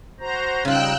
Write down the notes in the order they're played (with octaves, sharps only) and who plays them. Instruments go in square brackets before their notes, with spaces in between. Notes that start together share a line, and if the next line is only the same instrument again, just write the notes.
[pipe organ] F#4 C5 A#5
[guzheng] C#3 F4 [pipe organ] G3 D#4 [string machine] G5 E6 F#6